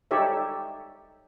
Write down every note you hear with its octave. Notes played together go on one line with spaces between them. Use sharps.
D#4 G4 A4 C#5 D5 E5